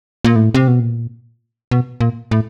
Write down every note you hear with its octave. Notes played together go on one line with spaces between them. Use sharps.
A#2
A2
C3
B2
A#2
B2
A#2
A2